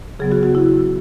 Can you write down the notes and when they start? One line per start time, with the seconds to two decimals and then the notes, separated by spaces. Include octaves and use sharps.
0.19 C#3 F#3 B3 G#4
0.32 F#4
0.43 F#4
0.55 E4